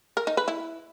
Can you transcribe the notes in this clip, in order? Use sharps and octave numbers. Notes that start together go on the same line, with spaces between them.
A#4
D#4
B4
E4